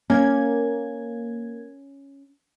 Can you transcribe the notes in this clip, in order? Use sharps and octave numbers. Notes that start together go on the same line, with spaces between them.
A#3 C#4 G#6